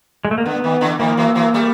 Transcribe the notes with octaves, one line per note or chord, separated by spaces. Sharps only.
G#3
A3
A#3
D3 B3
D#3
D3 E3
D#3 F3 A#3
E3 F#3
E3 F#3
G3 A3